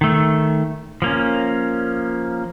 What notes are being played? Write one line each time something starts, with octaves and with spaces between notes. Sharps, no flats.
D#3 A3
F3 A#3 C#4